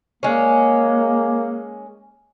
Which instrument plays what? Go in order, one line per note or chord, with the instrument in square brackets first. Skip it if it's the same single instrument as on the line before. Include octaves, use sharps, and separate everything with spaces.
[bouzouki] G#3 C#4 [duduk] A#3